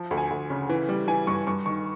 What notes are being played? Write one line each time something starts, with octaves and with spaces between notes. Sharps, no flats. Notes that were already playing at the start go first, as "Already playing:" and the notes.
Already playing: F3
D2
G#5
D2
C#3
E3
G3
E3 G#5
G2 C#6
G2 C#6
D#3 C#6